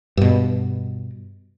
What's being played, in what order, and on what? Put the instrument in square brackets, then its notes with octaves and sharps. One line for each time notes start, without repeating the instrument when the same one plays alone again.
[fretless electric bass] G2 B2